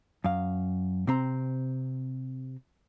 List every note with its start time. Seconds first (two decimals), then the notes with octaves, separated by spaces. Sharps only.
0.24 F#2 F5
1.07 C3 C4 A#5